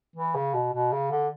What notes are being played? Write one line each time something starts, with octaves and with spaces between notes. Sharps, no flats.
E3
C#3
B2
B2
C#3
D3